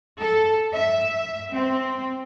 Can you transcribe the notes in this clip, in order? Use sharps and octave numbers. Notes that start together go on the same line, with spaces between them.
A4
E5
C4